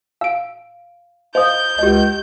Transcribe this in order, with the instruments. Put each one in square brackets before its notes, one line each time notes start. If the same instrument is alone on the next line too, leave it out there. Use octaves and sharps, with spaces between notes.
[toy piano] F5 [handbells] E6 D7
[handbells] C5 [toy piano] D#5 F5 D#6 [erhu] G6
[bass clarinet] C#2 [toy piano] G4 D#5